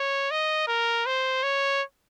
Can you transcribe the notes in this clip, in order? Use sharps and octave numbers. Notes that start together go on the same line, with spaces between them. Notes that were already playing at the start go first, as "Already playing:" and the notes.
Already playing: C#5
D#5
A#4
C5
C#5